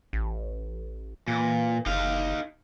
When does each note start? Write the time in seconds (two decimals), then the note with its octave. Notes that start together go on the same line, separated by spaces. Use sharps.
0.13 A1
1.28 A#2 E3
1.86 F#1 D#4 F5